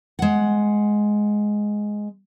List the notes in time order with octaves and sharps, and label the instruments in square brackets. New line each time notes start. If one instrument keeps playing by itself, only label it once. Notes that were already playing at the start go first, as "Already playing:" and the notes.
[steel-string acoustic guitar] G#3 F#5